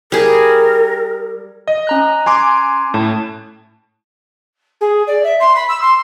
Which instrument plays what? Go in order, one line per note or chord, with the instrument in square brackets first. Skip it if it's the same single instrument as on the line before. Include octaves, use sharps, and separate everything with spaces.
[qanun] G3 G#4 [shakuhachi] A#4
[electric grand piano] D#5
[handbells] C#4 A#5 F#6
[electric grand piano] G#5 C6 D6
[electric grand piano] A2 [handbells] A5 G#6
[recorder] G#4
D5
E5
C6
B5
E6
C6